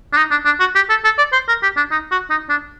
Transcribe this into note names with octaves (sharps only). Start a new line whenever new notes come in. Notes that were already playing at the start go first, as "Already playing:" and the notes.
D4
D#4
D4
D4
F#4
G4
A4
A4
D5
C5
A#4
G4
D4
D#4
F#4
D#4
D4